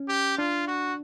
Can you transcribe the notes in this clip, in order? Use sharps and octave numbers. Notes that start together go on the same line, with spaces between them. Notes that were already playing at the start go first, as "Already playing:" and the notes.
Already playing: C#4
G4
D4 F4
F#4